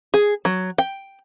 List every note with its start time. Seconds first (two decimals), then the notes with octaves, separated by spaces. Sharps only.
0.14 G#4
0.45 F#3
0.78 G5